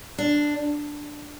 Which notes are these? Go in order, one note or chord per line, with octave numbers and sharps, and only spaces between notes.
D4